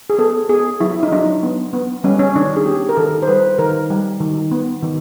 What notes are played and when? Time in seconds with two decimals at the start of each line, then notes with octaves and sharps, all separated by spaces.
0.10 G#4
0.18 B3 A4
0.49 B3 G#4
0.80 F#3 E4
1.03 D#4
1.12 F#3 D4
1.43 B3
1.73 B3
2.04 G3 C#4
2.19 C#4
2.36 D#3 D4
2.56 G#4
2.66 B3 G4
2.89 A#4
2.97 D#3 A4
3.22 C5
3.28 G3 B4
3.58 D#3 A#4
3.90 G3
4.20 D#3
4.51 B3
4.83 D#3